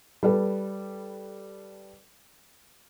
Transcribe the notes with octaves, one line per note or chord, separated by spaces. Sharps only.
G3 A4 B4